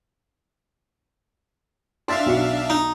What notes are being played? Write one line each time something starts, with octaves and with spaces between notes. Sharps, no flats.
D4 E5 F5 C6 A6
B1 F#4 C#7
D#4